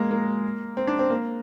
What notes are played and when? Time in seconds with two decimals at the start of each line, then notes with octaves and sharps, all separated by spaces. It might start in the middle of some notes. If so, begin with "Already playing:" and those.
Already playing: G#3 A#3
0.11 A#3
0.77 C4
0.87 D4
0.99 C4
1.10 A#3